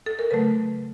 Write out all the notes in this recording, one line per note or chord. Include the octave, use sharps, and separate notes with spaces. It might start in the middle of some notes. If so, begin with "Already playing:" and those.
A4
A#4
C#3 F#3 A3 B4